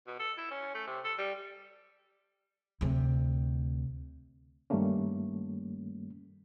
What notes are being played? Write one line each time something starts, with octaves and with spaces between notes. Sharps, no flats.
B2
A4
E4
C#4
A3
C3
A4
G3
D2 C3
G2 D#3 G3 A3 A#3 C#4